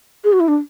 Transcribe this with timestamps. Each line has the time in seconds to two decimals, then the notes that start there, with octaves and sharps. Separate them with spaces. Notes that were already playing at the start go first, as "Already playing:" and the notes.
0.24 G#4
0.33 F#4
0.40 E4
0.48 D4